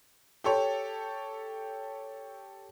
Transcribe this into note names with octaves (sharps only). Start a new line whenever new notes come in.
G4 A4 C#5